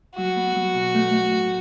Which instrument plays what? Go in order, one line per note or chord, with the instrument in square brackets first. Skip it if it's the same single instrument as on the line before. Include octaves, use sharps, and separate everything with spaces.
[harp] F#3 [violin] F#4
[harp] B3
F#3
B2
A3
A3
A2